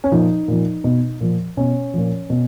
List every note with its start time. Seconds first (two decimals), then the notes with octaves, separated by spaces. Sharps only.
0.04 C#4
0.12 A#2 F3 D#4
0.48 A#2 F3
0.84 B2
1.21 A#2 F3
1.57 B2 C#4
1.94 A#2 F3
2.30 B2